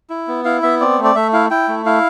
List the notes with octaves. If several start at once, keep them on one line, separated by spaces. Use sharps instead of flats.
E4
B3
E4 F5
B3 E5
C4 D5
A3
D5
A3 E5
E4 F5
E4 G5
A3
E4 F5